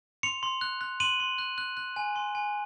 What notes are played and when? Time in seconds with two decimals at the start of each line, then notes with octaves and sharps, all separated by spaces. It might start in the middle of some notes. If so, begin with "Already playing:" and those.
0.23 C6 C#7 F7
0.43 C6
0.61 F#6
0.81 F#6
1.00 C6 D#7 F#7
1.20 C6
1.38 F#6
1.58 F#6
1.77 F#6
1.96 G#5
2.16 C6
2.35 G#5